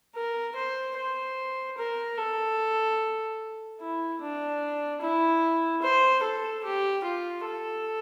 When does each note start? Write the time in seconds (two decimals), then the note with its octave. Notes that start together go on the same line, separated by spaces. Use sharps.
0.15 A#4
0.56 C5
0.97 C5
1.78 A#4
2.17 A4
3.80 E4
4.21 D4
5.02 E4
5.82 C5
6.23 A4
6.64 G4
7.04 F4
7.45 A4